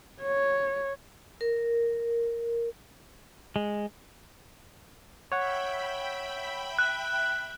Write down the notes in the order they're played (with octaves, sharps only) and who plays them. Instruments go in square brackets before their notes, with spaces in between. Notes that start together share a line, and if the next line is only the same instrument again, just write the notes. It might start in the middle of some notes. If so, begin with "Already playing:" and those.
[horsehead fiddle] C#5
[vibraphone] A#4
[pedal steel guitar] G#3
[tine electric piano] C#5 F#5 [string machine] E5 G5 B5
[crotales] F#6